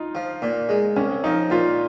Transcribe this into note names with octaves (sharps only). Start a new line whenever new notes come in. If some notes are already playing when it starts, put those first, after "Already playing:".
Already playing: D#4 F4
F3
A#2
G#3
C2 C#4
F3 D#4
A#2 F4